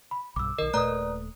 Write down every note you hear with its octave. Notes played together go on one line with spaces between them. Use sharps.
B5
B1 G2 D6 E6
B1 D#3 A#4 D#5
D#1 A#2 A3 B4 D5 A#5 D#6 F#6